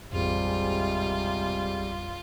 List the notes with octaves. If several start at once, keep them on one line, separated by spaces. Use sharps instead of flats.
A1 F2 C3 G3 G#3 F4